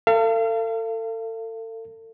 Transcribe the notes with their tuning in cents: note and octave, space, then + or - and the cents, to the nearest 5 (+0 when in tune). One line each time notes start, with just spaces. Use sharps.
A4 +35 F5 -35